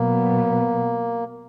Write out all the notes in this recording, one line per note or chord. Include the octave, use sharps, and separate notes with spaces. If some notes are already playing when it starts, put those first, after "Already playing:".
Already playing: B2 F#3 A#3 B3